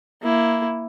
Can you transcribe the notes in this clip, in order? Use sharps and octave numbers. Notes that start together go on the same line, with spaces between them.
A#3 E4